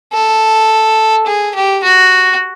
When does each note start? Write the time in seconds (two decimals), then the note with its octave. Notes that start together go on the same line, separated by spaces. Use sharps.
0.13 A4
1.26 G#4
1.55 G4
1.84 F#4